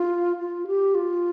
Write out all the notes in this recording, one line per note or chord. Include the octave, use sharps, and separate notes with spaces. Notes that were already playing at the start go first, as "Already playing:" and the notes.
Already playing: F4
F4
G4
F4